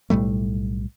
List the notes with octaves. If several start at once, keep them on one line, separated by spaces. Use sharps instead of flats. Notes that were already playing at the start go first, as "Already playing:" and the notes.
B1 A2 G3 A3